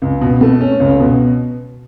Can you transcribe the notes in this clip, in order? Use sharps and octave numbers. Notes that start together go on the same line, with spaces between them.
C#2
B2
A3
C#4
C#2
B2